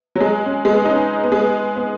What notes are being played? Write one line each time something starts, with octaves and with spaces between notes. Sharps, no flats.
F#3
G#3
C#4
G#3
B3
D#4
C#4
B3
G#3
B3
B3